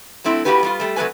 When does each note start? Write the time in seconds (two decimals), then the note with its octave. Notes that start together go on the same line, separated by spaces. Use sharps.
0.24 F#3 A3 C4 E4
0.45 A#3 B3 E4 F#4 G4 B4
0.63 G3 B3 F4
0.80 G3 A3
0.96 C3 F#3 A3 A#3 B4 G#5